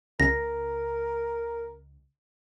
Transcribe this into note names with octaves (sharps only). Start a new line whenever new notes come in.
C#2 A#4 A#6